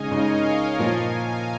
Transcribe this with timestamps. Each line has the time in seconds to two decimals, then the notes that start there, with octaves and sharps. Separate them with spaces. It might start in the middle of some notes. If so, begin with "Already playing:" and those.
Already playing: C#3 G#3 D#4 C#5 D#5 F5 G#5
0.11 C#3 G#3 D#4 A#4 D#5
0.44 C#5 F5
0.78 A#2 F3 A#3 F4 D#5 G#5
1.11 F5 A#5